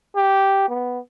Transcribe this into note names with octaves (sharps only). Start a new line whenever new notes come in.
G4
B3